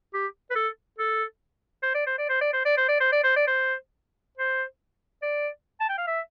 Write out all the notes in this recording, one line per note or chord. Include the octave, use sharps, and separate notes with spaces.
G4
B4
A4
A4
C5
D5
C5
D5
C5
D5
C5
D5
C5
D5
C5
D5
C5
D5
C5
C5
D5
A5
G5
F5
E5